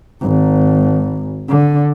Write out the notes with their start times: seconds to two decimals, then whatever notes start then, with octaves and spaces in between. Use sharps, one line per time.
0.22 G#1
1.48 D3